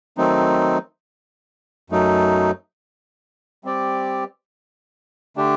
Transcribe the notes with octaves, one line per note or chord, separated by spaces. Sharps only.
D#3 F#3 A3 C4 D#4
F#2 F#3 A3 D#4
G3 C4 G4 D5
D3 A3 D4 G4